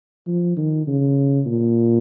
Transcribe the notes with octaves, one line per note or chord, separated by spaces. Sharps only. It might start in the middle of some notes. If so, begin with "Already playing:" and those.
F3
D#3
C#3
A#2